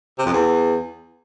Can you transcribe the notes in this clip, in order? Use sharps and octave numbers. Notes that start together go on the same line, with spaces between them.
C3
F2
E2